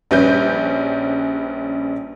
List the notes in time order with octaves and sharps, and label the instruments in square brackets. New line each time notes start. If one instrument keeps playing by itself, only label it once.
[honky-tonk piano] A#1 G3 C#4 B4 G6